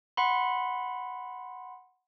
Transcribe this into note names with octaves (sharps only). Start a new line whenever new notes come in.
F#5 B5 C6